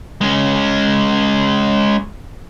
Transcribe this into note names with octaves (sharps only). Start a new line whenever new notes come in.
G#3 C#4